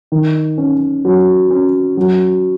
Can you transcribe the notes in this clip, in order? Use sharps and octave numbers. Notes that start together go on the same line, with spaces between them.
D#3
C#4
F#3
C#4
F#3